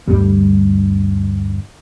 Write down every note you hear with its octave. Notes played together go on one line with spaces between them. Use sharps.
D2 G2 G3